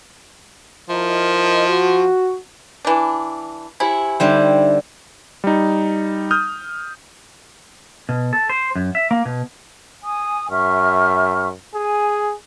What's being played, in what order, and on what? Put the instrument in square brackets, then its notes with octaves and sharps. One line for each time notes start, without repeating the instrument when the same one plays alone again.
[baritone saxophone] F3 [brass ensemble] E4 A#4 D#5
[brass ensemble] F#4
[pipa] E3 D4
[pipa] E4 [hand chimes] G4 C5 G#5
[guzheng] D3 G3 C5 [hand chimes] D#4 E5 G5
[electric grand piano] G3 D#4
D#6 F6 G6
[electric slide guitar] B2
A4
C5
F#2
E5
A#3
B2
[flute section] G#5 D#6
[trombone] F#2 [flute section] E5 C#6 F6
[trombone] G#4 [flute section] G#5